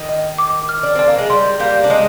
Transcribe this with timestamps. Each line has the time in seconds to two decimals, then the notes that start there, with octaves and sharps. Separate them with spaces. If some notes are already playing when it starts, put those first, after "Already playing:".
Already playing: D#3
0.09 D#5
0.38 D6
0.69 F6
0.83 D4
0.95 C4 D5
1.07 A#3
1.18 G#3
1.30 G3 C6
1.60 G3 A#3 G6
1.84 D4
1.90 G#3 C4 D#5